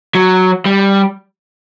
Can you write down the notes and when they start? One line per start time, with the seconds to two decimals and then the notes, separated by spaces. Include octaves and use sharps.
0.15 F#3
0.65 G3